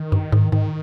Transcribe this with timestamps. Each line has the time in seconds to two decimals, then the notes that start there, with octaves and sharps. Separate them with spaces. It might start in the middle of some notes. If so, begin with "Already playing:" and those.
Already playing: D#3
0.12 G2
0.32 G#2
0.52 G#2 D#3